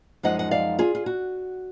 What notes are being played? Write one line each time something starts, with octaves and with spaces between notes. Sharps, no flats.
F#2 F3 G#3 D#4 D#5 F#5
F#5
D5 F5
F4 G#4
F4
F#4